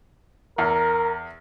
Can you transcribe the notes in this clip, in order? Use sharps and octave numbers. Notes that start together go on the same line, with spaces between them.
E2 A#4